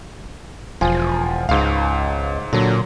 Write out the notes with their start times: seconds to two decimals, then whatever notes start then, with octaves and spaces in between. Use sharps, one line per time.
0.81 E1 F3 F4 G#5
1.49 C#2 G#2 F5
2.53 A#2 D3 F#3